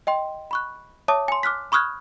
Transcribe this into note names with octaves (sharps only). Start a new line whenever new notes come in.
D#5 G5 C6
B5 C#6 F#6
C#5 E5 A5 D6 D#6
G#5 C6
D6 F6 F#6 B6
B5 C#6 D#6 F6 F#6 G#6